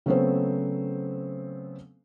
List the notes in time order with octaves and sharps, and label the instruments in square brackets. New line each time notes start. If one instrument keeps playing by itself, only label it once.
[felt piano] C#3 F#3 A3 B3 C4 C5